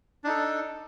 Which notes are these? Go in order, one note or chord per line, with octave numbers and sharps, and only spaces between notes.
D4 D#4 A4